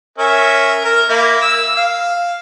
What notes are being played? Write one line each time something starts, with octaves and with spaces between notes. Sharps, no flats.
C#4 A#4 E5
A#4
A#3 E4
E6
F5